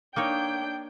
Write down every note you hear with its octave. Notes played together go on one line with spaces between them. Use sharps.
A#3 D4 D#4 C#5 G5 G6